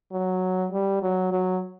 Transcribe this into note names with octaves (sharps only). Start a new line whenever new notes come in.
F#3
G3
F#3
F#3